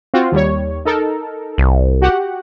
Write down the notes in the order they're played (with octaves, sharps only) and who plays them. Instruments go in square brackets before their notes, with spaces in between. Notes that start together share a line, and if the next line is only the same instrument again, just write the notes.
[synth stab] C4 F4 F#4
D#2 G3 C#5
D#4 A4 A#4
[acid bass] C2
[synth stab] F#4 G4 F#5